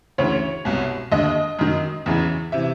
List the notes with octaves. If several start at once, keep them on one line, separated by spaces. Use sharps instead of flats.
D2 C#3 E3 C#5
C2 B2
D#2 D3 D#5
F#2 D#3
E2 C#3 E3
C3 E3 E5